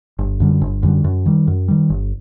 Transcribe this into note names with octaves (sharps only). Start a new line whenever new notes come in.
G1
F#2 D3 G3
G1
F#2 D3 G3
F#2
D#3 G3
F#2
D#3 G3
G1